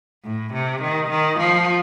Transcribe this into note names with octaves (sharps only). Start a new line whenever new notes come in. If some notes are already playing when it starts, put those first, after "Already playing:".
A2
C3
D#3
D#3
F3